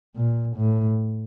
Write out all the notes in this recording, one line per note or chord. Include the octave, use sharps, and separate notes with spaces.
A#2
A2